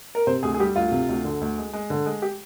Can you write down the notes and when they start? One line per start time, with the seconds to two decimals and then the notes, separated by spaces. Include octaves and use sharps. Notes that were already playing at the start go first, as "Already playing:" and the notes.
0.15 A#4
0.27 C3 C5
0.43 D2 G#4
0.54 G#4
0.60 G3 G4
0.76 D2 F4
0.92 C3
1.09 D2
1.24 D3
1.41 D2
1.58 G#3
1.73 G#3
1.90 D3
2.06 G#3
2.22 G4